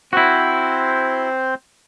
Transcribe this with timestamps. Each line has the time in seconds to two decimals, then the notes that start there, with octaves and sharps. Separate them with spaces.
0.13 C4 E4 F#4 C5